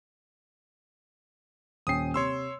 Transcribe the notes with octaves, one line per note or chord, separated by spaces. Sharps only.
D#1 C#4 G5 D#6 C7
C3 C#5 C6 E6